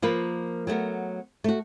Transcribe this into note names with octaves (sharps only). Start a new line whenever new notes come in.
F3 A#3 F4 A#4 B4
F#3 A3 B3 A#4
A3 F#4